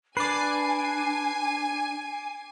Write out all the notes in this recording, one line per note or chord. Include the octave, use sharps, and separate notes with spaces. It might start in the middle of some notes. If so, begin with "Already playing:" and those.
D4 B4 D5 G#5 D6 C7